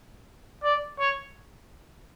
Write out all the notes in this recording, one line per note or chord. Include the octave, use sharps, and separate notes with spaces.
D5
C#5